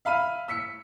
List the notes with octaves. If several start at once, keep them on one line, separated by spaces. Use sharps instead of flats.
E5 F5 B5 F6 D#7
E6 B6 C#7